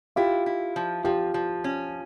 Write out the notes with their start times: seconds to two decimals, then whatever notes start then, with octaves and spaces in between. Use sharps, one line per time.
0.16 E4 F4 G4
0.46 E4
0.76 F3
1.04 F3 F4 G4
1.34 F3
1.64 C#4